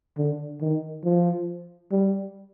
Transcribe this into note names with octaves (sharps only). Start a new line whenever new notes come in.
D3
D#3
F3
G3